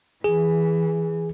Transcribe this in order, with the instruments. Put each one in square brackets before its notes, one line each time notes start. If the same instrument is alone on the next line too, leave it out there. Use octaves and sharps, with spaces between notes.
[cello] E3 [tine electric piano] G#4